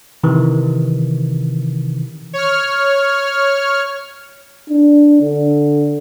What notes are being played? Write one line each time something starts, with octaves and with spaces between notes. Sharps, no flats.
C3 D#3 E3
C#5 F6
D4
D3